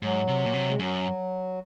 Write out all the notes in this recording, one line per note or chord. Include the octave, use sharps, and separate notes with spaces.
G#2 F#3
C3
A#2
C3
G#3
F#2 F#3